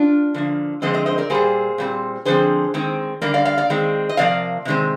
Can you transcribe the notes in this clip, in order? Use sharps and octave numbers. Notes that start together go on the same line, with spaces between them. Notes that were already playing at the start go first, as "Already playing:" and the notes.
Already playing: D4 F4
D3 F3 A#3
D3 F3 G#3 C4 C5 D#5
C5 D#5
C5 D#5
A#4 D5
A#2 G3 A#3 G#4 C5
A#2 G3 C4
D3 F3 C4 G#4 C5
D#3 G#3 C4
D3 G3 A#3 A#4 D5
D5 F5
D5 F5
D5 F5
D#3 G#3 C4
D#5
C3 F3 A#3 D5 F5
C3 D#3 G#3 C4